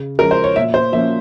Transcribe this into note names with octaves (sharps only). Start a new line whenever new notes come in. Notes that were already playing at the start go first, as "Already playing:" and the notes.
Already playing: C#3
F3 G#3 C#4 A#4
C5
C#5
A#2 E5
C5
F3 A#3 C#4 E5